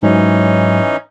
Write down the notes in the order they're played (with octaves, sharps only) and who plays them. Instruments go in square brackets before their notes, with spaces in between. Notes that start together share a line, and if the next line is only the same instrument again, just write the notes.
[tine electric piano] G#2 F#3 [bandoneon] E3 C#4 D#4